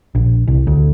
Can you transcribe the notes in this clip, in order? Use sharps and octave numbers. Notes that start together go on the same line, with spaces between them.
A#1
C2
D2